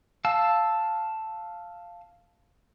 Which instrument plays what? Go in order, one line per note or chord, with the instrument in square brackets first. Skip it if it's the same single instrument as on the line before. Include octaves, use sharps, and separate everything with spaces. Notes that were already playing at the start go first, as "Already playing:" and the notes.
[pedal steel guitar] F5 A5 E6